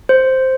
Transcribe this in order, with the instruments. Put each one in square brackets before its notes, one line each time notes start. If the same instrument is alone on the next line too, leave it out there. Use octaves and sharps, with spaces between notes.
[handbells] C5